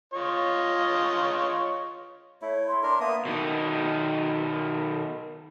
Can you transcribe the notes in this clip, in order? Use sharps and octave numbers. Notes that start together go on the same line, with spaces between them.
F4 C#5 D#5
A3 E4 C#5
C6
D4 A#4 C6
A#3 B3 E5 D#6
B2 D#3